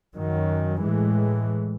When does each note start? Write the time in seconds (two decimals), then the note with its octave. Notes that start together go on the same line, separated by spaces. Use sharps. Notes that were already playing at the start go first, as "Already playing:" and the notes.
0.15 F#2 D#3 F#3
0.81 A2 E3 G#3